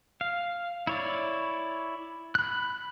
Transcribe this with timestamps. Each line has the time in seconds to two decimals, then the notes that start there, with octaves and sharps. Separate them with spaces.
0.21 F5
0.87 E4 C#5 D5
2.35 B5 F#6